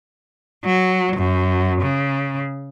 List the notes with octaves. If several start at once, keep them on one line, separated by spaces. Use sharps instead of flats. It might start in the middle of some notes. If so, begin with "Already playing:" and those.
F#3
F#2
C#3